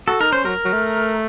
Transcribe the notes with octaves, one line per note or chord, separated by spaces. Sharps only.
F#4 A4
D#4 A#4
C#4 C5
F#3 A#4
F#3
A3